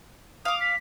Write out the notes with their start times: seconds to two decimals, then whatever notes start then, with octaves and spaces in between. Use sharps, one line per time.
0.45 F5 D6 D#6
0.61 B6